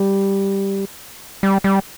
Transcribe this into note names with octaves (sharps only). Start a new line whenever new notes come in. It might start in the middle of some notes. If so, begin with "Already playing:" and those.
Already playing: G3
G3
G3